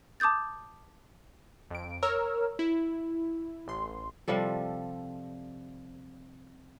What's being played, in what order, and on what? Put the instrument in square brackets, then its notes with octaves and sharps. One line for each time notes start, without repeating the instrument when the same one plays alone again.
[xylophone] A5 D6 D#6 G6 A6
[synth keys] F2 D7
A#4 C#5 A#5 E6 F6
E4
A1 C6
[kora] C3 F3 G3 A4